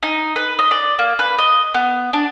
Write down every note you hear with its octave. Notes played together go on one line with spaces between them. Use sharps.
D#4
B4
D#5
D5
A#3
B4
D#5
B3
D4